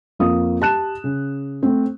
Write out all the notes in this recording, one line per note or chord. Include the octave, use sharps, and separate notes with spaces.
F2 F3 A#3 D#6
G4 A5 F#6 E7
C#3
A3 C4